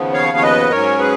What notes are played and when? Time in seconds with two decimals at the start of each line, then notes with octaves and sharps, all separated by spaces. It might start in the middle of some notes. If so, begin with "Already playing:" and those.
Already playing: D#2 C#3 F3 B3
0.13 C#5 F5
0.37 C#5
0.42 B4 D#5
0.70 G#2 F#3 C#4 A#4 C#5
0.99 G#4 B4